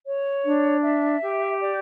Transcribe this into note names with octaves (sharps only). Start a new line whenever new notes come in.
C#5
D4
E5
G4
D5